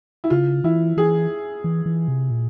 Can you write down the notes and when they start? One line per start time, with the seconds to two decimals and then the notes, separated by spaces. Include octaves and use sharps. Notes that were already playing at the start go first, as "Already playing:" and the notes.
0.24 E4
0.30 C#3 F4
0.64 E3 E4
0.97 E3 G#4
1.64 E3
1.86 E3
2.08 C3
2.30 A#2